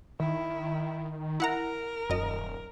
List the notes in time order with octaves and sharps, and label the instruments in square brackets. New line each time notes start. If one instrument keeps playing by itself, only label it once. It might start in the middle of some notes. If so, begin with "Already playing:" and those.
[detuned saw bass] D#3 [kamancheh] E4
[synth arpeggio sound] E4 F#5 A#5 [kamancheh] A#4
[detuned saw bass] D#1 [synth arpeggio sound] F#2 D#5